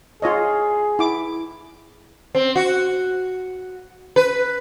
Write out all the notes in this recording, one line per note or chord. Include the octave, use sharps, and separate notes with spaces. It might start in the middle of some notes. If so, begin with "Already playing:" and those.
F4 G#4 C#5 D#5
E4 D6
C4
F#4
B4